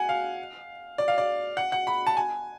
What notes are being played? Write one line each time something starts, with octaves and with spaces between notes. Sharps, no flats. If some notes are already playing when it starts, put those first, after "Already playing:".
Already playing: F#5 G#5
F5
D5
F5
D5
F#5
F#5
B5
A5
G#5